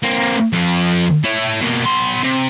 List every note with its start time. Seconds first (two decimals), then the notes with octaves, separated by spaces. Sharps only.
0.03 A#3 C4
0.53 F2 F3
1.24 E4 C#5
1.60 B2 A#3
1.84 B3 C6
2.23 C3